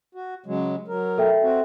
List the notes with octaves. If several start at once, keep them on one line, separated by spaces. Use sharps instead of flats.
F#4
C#3 F#3 G#3
F#3 A#4
A4 E5 G5
C4 F#4